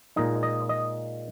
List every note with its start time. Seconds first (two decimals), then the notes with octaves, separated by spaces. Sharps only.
0.16 A#2 G#3 D#4 D#5
0.43 D#5
0.69 D#5